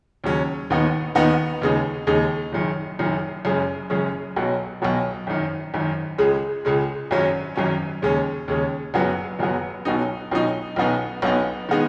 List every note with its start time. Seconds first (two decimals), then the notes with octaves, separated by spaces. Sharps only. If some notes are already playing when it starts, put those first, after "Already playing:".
0.24 D#2 C#3 F#3 C#4
0.70 D#2 D#3 B3 D#4
1.15 D#2 D#3 B3 D#4
1.61 D#2 C#3 G#3 D#4
2.07 D#2 C#3 G#3 D#4
2.52 F#1 F#2 D#3
2.99 F#1 F#2 D#3
3.45 F#1 F#2 C#3 G#3 C#4
3.90 F#1 F#2 C#3 G#3 C#4
4.36 B1 B2 F#3
4.82 B1 B2 F#3
5.27 G#1 F#2 D#3
5.74 G#1 F#2 D#3
6.18 C#2 C#3 G#3
6.65 C#2 C#3 G#3
7.11 G#1 F#2 F#3 C#4
7.56 G#1 F#2 F#3 C#4
8.02 D#2 C#3 G#3 C#4
8.48 D#2 C#3 G#3 C#4
8.94 F#1 F#2 F#3 B3
9.39 F#1 F#2 F#3 B3
9.85 B1 B2 F#3 D#4
10.31 B1 B2 F#3 D#4
10.76 B1 B2 B3 D#4
11.22 B1 B2 B3 D#4
11.69 D#3 G#3 B3 D#4